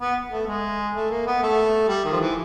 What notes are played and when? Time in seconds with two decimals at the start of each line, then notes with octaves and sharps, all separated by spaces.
0.01 B3
0.31 A3
0.47 G#3
0.95 A3
1.10 A#3
1.26 B3
1.42 A3
1.88 G3
2.05 D#3
2.12 F3
2.20 E3